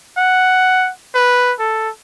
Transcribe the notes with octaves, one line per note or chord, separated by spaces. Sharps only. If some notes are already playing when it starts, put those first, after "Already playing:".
F#5
B4
A4